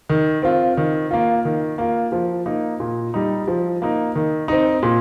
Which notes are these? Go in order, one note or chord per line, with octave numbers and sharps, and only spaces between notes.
D#3
C4 F4
D#3
A#3 F4
D#3
A#3 F4
F3
A#3 D#4
A#2
G3 D#4
F3
A#3 D#4
D#3
C4 D#4
A#2